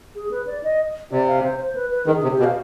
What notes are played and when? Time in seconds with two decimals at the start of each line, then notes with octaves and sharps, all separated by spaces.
0.16 G#4
0.31 B4
0.47 D5
0.63 D#5
1.12 C3 D5
1.28 F5
1.43 C5
1.59 C5
1.75 B4
1.91 B4
2.06 D#3 G#4
2.23 C3
2.31 G4
2.39 B2
2.44 F5